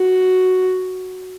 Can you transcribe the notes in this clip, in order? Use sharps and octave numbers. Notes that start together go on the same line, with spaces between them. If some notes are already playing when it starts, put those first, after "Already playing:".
Already playing: F#4